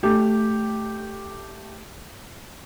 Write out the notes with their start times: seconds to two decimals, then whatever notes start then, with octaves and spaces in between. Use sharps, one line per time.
0.03 A3 G4